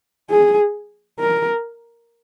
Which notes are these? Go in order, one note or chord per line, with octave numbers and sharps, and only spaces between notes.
G#4
A#4